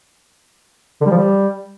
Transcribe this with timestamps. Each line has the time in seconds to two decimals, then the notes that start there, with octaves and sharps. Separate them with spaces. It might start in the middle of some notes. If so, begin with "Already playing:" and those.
1.01 D3
1.06 G3
1.11 F3
1.16 G3